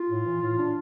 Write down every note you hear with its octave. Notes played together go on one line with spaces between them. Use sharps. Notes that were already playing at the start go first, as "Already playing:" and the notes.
Already playing: F4
A2
E3
A2
D4